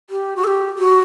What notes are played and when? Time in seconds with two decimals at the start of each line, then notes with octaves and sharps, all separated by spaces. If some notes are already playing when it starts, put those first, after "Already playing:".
0.10 G4
0.36 F#4
0.44 A4
0.47 G4
0.79 F#4